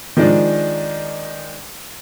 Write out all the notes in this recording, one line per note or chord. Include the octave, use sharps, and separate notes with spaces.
D#3 F3 G#3 D4